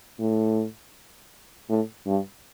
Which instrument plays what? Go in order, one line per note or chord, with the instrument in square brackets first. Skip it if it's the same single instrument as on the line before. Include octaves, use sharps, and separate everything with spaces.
[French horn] A2
A2
G2